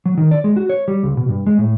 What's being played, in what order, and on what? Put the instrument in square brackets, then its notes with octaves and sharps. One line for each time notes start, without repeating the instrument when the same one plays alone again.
[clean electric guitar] F#3
D#3
D5
G#3
F#4
C#5
G3
C#2
B2
G2
G#3
A2